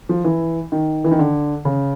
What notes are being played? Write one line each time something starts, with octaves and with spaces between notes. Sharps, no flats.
F3
E3
D#3
E3
D#3
D3
C#3